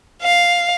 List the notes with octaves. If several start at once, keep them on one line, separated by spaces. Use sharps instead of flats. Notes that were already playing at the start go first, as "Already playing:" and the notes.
F5